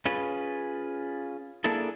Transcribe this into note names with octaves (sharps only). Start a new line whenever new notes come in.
C#4 F4 G#4 B4
A#3 D4 E4 G#4 A4